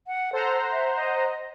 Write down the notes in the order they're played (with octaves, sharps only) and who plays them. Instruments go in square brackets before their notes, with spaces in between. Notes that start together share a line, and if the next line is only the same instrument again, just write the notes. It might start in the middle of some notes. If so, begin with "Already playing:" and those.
[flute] F#5
[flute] A4 [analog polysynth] C5 F#5 A#5
[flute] E5
D#5